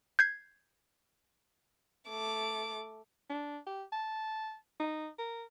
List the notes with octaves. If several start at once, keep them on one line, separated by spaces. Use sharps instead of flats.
G6 G#6 C7
A3 D6
D4
G4
A5
D#4
A#4